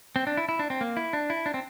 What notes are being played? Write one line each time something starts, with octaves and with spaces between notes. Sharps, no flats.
C4
D4
E4
E4
D4
C4
A#3
E4
D4
E4
D4
C4